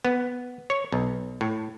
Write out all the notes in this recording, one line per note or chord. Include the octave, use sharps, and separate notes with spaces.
B3
C#5
B1
A2